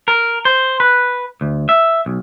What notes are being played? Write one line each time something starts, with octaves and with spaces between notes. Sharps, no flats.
A#4
C5
B4
D2
E5
B1